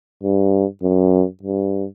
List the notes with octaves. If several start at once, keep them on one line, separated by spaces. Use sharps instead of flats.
G2
F#2
G2